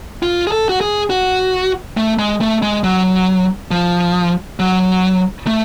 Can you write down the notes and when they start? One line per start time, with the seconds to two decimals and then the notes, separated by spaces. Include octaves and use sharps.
0.23 F4
0.47 G#4
0.52 A4
0.69 F#4
0.81 G#4
1.10 F#4
1.97 A3
2.19 G#3
2.41 A3
2.62 G#3
2.84 F#3
3.71 F3
4.60 F#3
5.47 A3